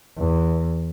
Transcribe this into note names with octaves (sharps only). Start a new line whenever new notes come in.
E2